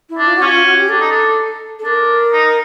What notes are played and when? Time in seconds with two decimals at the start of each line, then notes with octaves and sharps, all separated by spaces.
0.10 E4
0.18 D4
0.25 F4
0.36 F#4
0.41 C#4 F4
0.53 F4
0.65 F#4
0.77 G4
0.89 D4 A4
1.00 D#4
1.11 D4
1.79 A4
1.84 D4 A#4
2.33 D#4